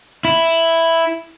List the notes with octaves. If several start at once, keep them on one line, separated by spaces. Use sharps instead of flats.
E4